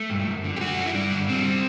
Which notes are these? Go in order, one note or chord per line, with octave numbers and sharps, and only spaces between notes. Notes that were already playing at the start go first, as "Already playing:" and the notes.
Already playing: A3
G2
F#2
D3
G4
A3 F#4
F#2
E4
G2 D4
D3
G3 C4